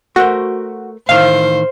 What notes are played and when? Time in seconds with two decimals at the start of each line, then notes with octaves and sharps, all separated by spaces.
0.16 A3 F#4 A#4 C5
1.09 A2 D#3 E3 C5 F5